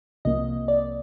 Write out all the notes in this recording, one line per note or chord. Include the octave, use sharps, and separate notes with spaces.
C2 C3 F3 A#3 D#5
D5